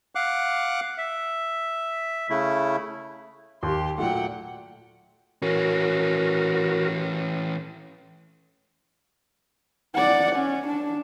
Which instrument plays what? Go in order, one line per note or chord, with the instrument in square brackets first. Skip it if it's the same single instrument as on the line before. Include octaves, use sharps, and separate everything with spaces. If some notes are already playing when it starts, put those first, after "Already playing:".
[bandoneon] F5 F#5 D6 F#6
E5
C#3 A3 E4
[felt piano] D#2 [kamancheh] G4 C6
[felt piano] A#2 F#3 A3 [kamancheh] F#5 G5
[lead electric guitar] E3 C#4 [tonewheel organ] F#4 A#4
[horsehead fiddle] D5 F#5
C#4
D4